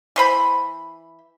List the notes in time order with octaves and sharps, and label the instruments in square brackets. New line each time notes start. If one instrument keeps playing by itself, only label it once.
[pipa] E3 C5 B5